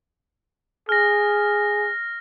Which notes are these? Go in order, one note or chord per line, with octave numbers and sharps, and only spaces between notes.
G#4 F6 A#6